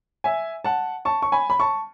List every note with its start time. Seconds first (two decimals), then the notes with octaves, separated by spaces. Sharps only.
0.24 E5 G#5
0.65 F#5 A5
1.05 A5 C#6
1.22 C#6
1.32 G#5 B5
1.50 B5
1.60 A5 C#6